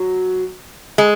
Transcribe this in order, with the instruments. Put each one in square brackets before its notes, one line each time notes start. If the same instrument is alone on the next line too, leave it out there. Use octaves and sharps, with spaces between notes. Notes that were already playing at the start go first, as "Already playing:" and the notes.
Already playing: [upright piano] F#3
[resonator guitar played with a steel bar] G#3